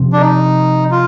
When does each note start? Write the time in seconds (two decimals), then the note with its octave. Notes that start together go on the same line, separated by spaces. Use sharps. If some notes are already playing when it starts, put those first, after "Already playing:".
Already playing: C3 F3 C4
0.13 D4
0.21 D#4
0.91 F4